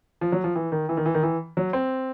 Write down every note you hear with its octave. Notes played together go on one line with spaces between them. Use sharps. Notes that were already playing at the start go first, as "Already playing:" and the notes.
F3
F#3
F3
E3
D#3
E3
D#3
E3
D#3
E3
F#3
C4